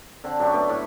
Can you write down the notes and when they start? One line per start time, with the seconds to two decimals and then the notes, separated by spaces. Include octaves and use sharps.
0.24 D3 C4
0.39 F#2 D4 G4 C#6
0.53 A3 B3 G4
0.69 A2